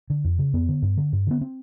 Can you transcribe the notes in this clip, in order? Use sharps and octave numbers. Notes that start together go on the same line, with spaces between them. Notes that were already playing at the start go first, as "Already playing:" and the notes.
D3
F2
C#3
F2 B3
D3
G2
D3
G2
D3 B3
C4